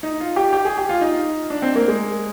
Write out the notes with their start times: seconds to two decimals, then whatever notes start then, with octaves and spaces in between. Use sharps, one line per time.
0.03 D#4
0.20 F4
0.36 G4
0.53 G4
0.65 G#4
0.77 G4
0.89 F4
1.01 D#4
1.50 D4
1.62 C4
1.75 A#3
1.88 G#3